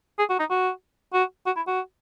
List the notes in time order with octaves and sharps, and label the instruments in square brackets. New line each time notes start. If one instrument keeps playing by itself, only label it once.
[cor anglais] G#4
F#4
D#4
F#4
F#4
F#4
E4
F#4